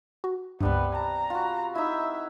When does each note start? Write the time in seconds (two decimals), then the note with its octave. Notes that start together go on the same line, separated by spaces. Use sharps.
0.24 F#4
0.60 C#2 G2 C3 G3 B3 B4
0.95 A5 A#5
1.30 F4 F#4
1.75 D#4 E4 E5